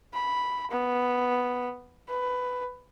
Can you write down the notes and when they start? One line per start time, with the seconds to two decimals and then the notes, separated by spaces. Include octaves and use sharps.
0.14 B5
0.71 B3
2.09 B4